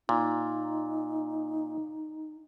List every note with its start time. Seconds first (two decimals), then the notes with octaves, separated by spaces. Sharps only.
0.09 A#2 D#4